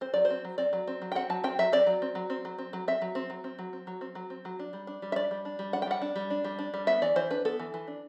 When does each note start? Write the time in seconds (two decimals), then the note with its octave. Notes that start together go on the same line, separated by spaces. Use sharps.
0.01 C4 C5
0.14 F#3 D5
0.25 C5
0.30 C4
0.45 F#3
0.58 C4 D5
0.73 F#3
0.88 C4
1.02 F#3
1.12 G5
1.15 C4 F#5
1.30 F#3 A5
1.44 C4 G5
1.59 F#3 E5
1.72 C4 D5
1.86 F#3
2.02 C4
2.15 F#3
2.30 C4
2.45 F#3
2.58 C4
2.73 F#3
2.88 C4 E5
3.02 F#3
3.15 C4
3.30 F#3
3.44 C4
3.59 F#3
3.73 C4
3.87 F#3
4.01 C4
4.15 F#3
4.30 C4
4.45 F#3
4.59 D4
4.73 G3
4.87 D4
5.02 G3
5.12 E5
5.16 D4 D5
5.31 G3
5.45 D4
5.59 G3
5.73 D4 F#5
5.82 G5
5.87 G3 F#5
6.02 D4
6.16 G3
6.30 D4
6.44 G3
6.59 D4
6.74 G3
6.87 B3 E5
7.02 E3 D5
7.16 E3 C5
7.31 D4 B4
7.45 B3 A4
7.60 E3
7.74 E3
7.87 D4